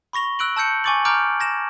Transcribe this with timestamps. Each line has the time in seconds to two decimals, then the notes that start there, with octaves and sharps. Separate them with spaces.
0.13 B5 C#6 A#6 F7 G7
0.39 E6 F#6 D7 F#7
0.57 A5 E6 G6 C#7
0.84 G#5 C#6 D6 A6 F#7
1.05 A#5 D6 F6 G6 D7
1.40 G#6 A#6 E7